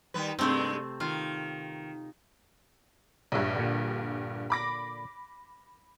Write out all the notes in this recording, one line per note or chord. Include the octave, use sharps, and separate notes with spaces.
D#3 G3 B4
G2 C3 G#3 A3 C4
D#3 F4
A#1 G2 C#5 E5
A#2 D3
B5 D6 A#6